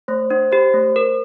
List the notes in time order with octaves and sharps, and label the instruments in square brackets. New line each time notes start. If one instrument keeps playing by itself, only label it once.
[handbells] A3 [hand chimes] C5
[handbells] D4 [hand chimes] C5
[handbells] G4 [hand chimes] C5
[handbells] A3
A#4